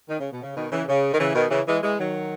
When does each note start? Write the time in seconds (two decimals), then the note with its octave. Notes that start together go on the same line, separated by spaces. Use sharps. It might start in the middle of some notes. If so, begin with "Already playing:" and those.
0.09 D#3
0.20 C#3
0.32 B2
0.43 C#3
0.56 B2 D#3
0.72 C#3 E3
0.88 C#3
1.13 D#3
1.19 C#3 E3
1.35 B2 D#3
1.50 C#3 E3
1.67 E3 G#3
1.82 E3 G#3
1.99 D#3 F#3